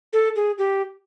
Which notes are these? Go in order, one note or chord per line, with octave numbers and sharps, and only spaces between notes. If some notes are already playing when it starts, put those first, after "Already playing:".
A4
G#4
G4